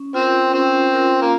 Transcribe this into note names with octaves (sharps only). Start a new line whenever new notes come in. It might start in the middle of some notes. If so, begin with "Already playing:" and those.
Already playing: C#4
C4 F4 A#4
C4 C#4
F4 A#4
A#3